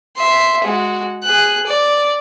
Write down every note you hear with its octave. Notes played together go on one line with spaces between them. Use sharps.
E5 C6
G#3 F#4
G#4 F#6
D5